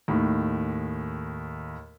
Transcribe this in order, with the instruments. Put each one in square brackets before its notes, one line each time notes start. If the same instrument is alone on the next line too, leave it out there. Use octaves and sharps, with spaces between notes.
[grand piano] D#2 A2